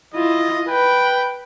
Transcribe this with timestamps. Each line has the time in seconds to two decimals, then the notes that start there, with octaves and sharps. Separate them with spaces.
0.14 E4 F4 D#5
0.69 B4 G5